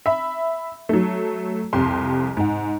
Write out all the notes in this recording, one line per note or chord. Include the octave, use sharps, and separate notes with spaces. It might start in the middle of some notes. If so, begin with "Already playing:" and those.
E5 B5
F#3 A3
C2 F2 G4 C6
G#2 F#5